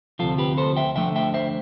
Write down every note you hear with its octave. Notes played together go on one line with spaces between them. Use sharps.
D2 C3 F3 F4 A4
G4 B4
A4 C5
E5 G5
D2 D3 F3 A3 E5 G5
E5 G5
C5 E5